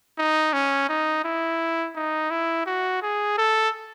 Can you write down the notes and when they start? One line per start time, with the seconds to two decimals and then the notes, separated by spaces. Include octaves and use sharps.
0.18 D#4
0.53 C#4
0.89 D#4
1.25 E4
1.96 D#4
2.31 E4
2.66 F#4
3.02 G#4
3.38 A4